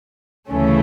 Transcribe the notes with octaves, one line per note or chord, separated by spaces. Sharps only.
D2 C#3 E3 A3 C#4